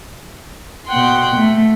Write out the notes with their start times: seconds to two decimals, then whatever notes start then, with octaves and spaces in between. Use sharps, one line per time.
0.88 B2 F#5 G5 C6
1.36 A3